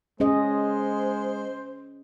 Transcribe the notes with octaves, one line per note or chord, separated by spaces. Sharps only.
G#3 C#4 G#4 C5 D#5